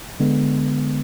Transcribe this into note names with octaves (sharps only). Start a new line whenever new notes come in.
D3 G#3 B3